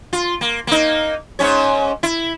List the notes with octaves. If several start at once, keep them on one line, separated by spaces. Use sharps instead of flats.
F4
A#3
A#3 D#4
G#2 C#4 C#5
E4